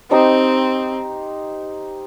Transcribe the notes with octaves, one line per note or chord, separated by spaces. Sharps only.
C4 D#4 G4 C5 D#5